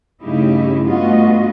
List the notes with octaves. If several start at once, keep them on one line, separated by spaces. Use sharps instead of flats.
G2 C#3 A3 D#4 E4 G4
G2 A3 B3 F4 F#4 D#5